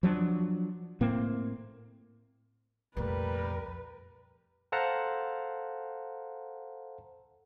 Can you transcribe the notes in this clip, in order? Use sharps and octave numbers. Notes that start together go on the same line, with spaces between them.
F3 F#3 C4 D4
A2 A#3 C4
C2 F2 A#2 G3 A3 A#4 B4
A4 C5 F5 F#5 A5 A#5